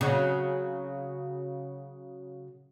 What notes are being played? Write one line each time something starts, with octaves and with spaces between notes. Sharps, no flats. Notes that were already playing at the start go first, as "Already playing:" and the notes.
C#3 F#3